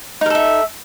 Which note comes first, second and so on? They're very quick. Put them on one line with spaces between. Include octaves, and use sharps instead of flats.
D#4 A#4 A4 E5